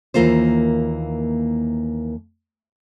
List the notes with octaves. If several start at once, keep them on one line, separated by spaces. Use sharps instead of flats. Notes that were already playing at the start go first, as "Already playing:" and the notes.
D#2 E3 A#3 F4 C5